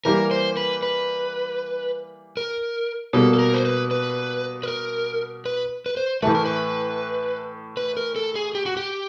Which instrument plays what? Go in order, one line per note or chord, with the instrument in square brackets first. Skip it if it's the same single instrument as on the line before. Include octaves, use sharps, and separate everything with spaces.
[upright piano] E3 G3 A#3 [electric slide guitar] A#4
[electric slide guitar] C5
B4
B4
A#4
[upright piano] B2 G3 A#3 [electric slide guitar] A4
[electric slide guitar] A4
A#4
C5
B4
B4
B4
A#4
B4
B4
C5
[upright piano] A2 E3 A3 [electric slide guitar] B4
[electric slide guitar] A#4
B4
B4
A#4
A4
G#4
G4
F#4
G4